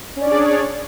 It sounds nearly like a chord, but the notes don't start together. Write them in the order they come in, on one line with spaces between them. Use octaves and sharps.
C#4 D5 D4 G#4 C#5